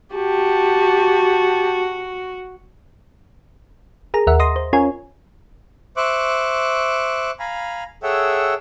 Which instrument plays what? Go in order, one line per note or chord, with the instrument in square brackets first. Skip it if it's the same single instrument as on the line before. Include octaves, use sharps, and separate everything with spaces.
[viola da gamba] F#4 [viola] G4 A5
[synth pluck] G#4 A#4 A#5
D#2 A#4 E5 F#5
D#5 C6 D#6 A#6
C5
C#4 F4 A#4 C#5 G#5
[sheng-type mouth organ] C5 E5 C#6 D6 F#6
F5 G#5 A#5 B5
G#4 A4 C#5 E5 F#5 G5